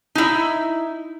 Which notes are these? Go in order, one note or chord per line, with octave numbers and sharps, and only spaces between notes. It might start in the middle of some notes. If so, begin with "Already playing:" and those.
D#4 E4